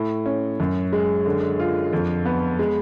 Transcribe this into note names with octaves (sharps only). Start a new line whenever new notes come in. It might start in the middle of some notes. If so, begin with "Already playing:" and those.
Already playing: A2
C#4
F#2
G#3
D3
F4
F2
B3
G#3